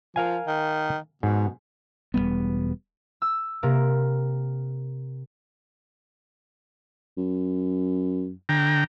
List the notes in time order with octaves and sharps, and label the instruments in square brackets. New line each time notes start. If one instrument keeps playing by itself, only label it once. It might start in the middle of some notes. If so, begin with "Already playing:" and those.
[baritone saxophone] F3 [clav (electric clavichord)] A#4 F5 G#5
[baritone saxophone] D#3
[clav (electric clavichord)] G#2 [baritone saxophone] B2
[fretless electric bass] E1 G#2 G3 B3
[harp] E6
C3 A#3 A#4
[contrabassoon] F#2
[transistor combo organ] D3 G5 A#5